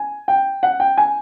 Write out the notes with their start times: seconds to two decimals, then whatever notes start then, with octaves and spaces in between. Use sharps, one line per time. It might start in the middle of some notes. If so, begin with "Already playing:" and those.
Already playing: G#5
0.28 G5
0.63 F#5
0.80 G5
0.98 G#5